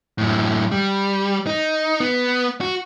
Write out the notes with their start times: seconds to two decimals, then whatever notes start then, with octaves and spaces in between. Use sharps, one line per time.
0.18 F#2 A2
0.72 G3
1.47 D#4
2.00 B3
2.61 F#4